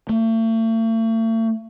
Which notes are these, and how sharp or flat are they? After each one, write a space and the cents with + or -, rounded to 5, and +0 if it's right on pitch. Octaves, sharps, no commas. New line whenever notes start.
A3 +40